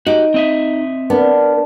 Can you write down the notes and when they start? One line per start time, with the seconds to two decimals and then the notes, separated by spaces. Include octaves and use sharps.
0.07 D#4 F#4 G4
0.34 C4 D#5 E5
1.10 B3 D4 A#4